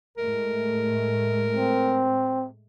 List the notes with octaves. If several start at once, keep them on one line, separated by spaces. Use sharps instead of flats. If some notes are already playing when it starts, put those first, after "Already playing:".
A2 G#3 A3 A#4
C4